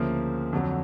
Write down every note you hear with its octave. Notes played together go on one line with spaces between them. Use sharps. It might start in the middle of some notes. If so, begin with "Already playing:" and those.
Already playing: D2 C#3 F3 A#3
F2 D3 F#3